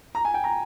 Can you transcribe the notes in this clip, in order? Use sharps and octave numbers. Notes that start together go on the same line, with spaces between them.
A#5
G#5
G5
A#5